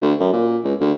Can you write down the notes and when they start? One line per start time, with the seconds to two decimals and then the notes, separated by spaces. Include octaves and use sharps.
0.02 D2
0.20 F#2
0.33 A#2
0.64 C#2
0.80 D2